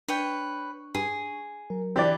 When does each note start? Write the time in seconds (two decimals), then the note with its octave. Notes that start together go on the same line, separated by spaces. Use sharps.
0.08 D4 B4 C#5 G5 C#6
0.95 G2 G#4
1.70 F#3 A#4
1.96 E3 C4 D4 G4 D5